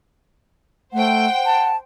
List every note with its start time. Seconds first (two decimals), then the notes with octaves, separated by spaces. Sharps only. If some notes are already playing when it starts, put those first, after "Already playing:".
0.93 A3 C5 F#5 G5
1.46 A5